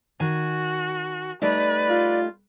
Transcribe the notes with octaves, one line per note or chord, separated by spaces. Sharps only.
D#3 F#4 G#5
G3 A3 D#4 B4 D5
F4